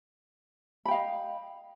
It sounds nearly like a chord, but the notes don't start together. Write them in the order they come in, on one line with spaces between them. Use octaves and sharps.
B5 G5 F5 D#5